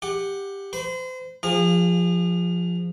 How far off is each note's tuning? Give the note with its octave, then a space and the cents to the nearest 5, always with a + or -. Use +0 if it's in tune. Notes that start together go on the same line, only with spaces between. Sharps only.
G4 +10 F#5 +0
C5 -35 B5 +0
F3 +0 G#4 -35 F5 +20